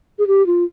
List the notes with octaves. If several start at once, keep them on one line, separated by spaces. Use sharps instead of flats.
G#4
G4
F4